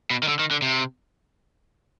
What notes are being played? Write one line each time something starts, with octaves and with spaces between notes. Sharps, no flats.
B2
D#3
D3
D#3
D3
C3